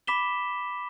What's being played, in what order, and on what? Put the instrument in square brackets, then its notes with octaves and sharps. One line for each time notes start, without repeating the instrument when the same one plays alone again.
[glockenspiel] B5 D6 B6 E7 G7